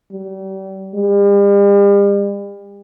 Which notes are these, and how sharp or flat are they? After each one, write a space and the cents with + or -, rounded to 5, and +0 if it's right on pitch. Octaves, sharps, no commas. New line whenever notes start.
G3 -35
G3 +40